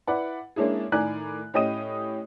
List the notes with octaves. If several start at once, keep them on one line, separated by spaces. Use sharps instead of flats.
E4 B4 D5 F#5
G#3 A#3 C#4 D4 E4 G#4
A2 D#3 A#4 D5 G#5 F#6
A2 C#4 G4 D#5 D#6 D#7